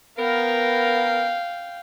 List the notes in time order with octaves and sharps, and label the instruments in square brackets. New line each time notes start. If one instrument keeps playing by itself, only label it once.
[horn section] B3 A#4 [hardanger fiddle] F5 G5